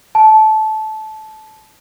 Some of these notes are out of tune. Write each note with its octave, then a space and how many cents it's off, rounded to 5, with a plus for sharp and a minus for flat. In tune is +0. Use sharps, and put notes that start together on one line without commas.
A5 -20